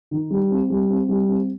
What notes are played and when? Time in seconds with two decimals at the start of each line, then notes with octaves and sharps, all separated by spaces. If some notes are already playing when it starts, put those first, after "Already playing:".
0.11 D#3
0.30 G3
0.51 C4
0.70 G3
0.90 C4
1.09 G3
1.28 C4